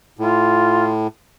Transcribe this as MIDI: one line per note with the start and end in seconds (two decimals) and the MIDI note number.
0.19 1.07 45
0.19 0.90 65